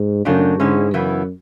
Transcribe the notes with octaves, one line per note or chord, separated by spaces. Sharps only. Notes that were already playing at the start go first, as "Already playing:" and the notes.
Already playing: G#2
F#2 C#3 F#3 A3 D4
G#2 D3 G#3 C#4 E4
F#2 C#3 E3 B3 E4